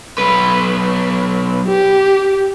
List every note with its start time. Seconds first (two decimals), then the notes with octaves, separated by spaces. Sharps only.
0.19 B1 B4
1.67 G4